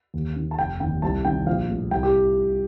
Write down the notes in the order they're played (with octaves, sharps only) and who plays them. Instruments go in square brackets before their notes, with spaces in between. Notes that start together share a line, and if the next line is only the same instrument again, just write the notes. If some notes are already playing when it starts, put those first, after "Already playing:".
[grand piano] D#2
D#3
A5
F1 G5
D#2 D#3 G5
C2 A5
C3 D#3 G5
A#1 F5
A2
C2 G5
G4